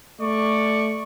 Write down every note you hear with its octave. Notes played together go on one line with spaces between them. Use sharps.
A3 D5 C#6